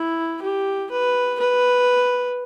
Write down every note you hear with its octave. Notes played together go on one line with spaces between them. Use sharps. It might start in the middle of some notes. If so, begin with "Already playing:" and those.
Already playing: E4
G4
B4
B4